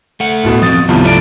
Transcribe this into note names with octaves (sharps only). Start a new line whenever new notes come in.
A3 F#5
D1 B2
F3 A#3 C4 D#6 A6
C2 G2 D#3 F3 B3
A3 C#5 D5